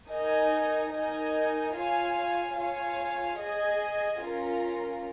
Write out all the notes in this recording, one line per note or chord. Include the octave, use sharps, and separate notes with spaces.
D#4 A#4 D#5 G#5
D#4 A#4 D#5 G#5
F4 C#5 F5 G#5
F4 C#5 F5 G#5
G#4 D#5 G#5
C#4 F4 A#4